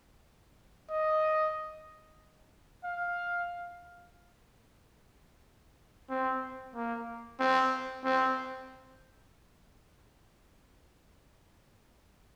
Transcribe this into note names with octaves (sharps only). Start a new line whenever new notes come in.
D#5
F5
C4
A#3
C4
C4